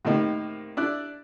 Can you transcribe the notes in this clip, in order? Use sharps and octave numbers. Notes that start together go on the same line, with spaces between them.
A2 C3 D#3 A#3 D#4
D4 E4 D5 F#6